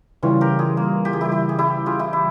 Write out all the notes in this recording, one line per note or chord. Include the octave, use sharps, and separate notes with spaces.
C#3 E3 G3 C#4 F4
G4 A#4
F4 G#4
A#3
G4
G#4
E4 G4
E4 G4
G#4
E4 G4
F4 G#4
E4 G4
E4